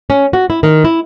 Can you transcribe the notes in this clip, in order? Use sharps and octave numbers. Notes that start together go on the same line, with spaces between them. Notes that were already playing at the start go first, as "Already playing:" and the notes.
C#4
F#4
E4
D#3
E4